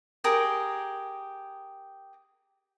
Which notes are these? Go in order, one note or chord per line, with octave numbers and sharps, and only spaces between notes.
G4 G#4 A#4